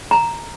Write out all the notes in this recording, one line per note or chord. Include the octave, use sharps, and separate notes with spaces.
A#5